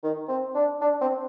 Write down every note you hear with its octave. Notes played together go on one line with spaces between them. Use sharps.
D#3
C4
D4
D4
C4